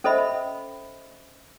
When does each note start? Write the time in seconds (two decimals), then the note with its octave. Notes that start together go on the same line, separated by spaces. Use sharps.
0.04 C#4 A4 C5 D#5 E5 B5